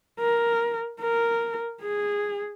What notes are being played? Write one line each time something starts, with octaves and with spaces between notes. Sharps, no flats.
A#4
A#4
G#4